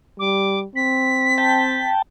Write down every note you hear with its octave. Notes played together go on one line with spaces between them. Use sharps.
G3 D6
C4 B6
G5 A5